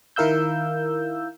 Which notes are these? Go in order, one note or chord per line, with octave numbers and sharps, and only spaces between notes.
D#3 E4 A#4 F5 E6 G6